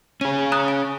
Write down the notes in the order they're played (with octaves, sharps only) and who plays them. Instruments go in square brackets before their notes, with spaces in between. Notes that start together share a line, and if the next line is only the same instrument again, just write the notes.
[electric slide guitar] C#4 G#4 [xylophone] D#7
[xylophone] A#5 D#6 F#6
G#5